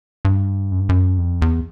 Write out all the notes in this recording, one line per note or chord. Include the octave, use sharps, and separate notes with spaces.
G2
F#2
G2
F#2
F2
E2